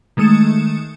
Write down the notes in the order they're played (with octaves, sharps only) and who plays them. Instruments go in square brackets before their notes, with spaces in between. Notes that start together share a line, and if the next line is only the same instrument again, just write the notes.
[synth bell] D#3 G#3 A3 D#6 C#7 E7